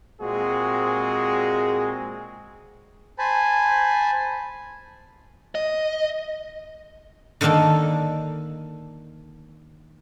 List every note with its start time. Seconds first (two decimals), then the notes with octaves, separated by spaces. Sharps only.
0.21 A#2 G#3 C4 F#4 G#4
3.19 C5 G#5 A5 B5
5.55 D#5
7.41 D3 D#3 A#3 D4 A4